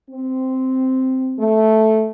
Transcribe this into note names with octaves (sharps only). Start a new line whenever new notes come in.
C4
A3